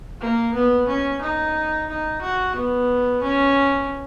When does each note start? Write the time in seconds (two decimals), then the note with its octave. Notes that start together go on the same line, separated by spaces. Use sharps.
0.21 A#3
0.54 B3
0.88 C#4
1.22 D#4
1.89 D#4
2.21 F#4
2.55 B3
3.22 C#4